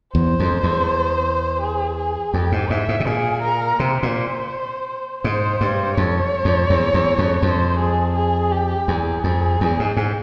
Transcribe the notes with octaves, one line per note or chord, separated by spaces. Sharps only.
E2 C5
F2
E2
G#4
G#4
F2 G4
G#2
G#2 E5
G#2
C3
A#2 G#4
A#4
C3 C5
A#2
G#2 C5
G2
F2 C#5
F2
E2
E2
F2
F2 C5
G#4
G#4
G4
E2 G#4
F2
E2
G#2
G#2